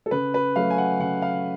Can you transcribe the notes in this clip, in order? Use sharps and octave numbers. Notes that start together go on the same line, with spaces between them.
A4
C#3 B4
B4
F#3 A3 F5
G#5
F#5
C#3 F#5
F5